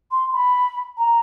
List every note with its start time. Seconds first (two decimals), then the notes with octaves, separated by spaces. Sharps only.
0.11 C6
0.32 B5
0.97 A#5